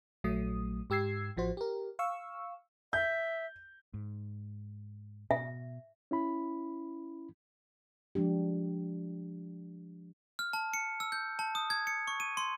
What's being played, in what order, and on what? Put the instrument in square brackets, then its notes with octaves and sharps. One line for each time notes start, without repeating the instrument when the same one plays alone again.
[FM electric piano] A#1 F#3 A3 D#6
G#2 G4 E6 G#6 C7
A1 F3 F#4 C5
G4 A#4
F5 C#6 E6
[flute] E5 [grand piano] G6
[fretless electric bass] G#2
[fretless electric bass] B2 [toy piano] E5
[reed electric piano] C#4 E4 B5
[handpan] F3 G#3 D4 G4
[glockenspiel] F6
A5
C#7
E6
G6
A5
D#6
G#6
C#7
C#6
D#7
C6